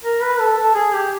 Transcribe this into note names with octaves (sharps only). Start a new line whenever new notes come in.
A#4
B4
A4
A4
G#4
G4